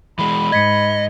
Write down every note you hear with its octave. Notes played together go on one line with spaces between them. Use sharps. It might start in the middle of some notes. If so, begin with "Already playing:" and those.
E3 G#3 B5
G#2 D#5 G#6 B6 C#7